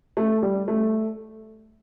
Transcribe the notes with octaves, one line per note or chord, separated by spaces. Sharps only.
A3
G3
A3